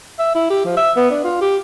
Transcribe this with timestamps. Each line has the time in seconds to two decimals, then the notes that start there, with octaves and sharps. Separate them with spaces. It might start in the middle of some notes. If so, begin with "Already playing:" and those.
0.19 E5
0.35 E4
0.50 G4
0.65 F3
0.77 E5
0.97 B3
1.11 D4
1.24 F4
1.41 G4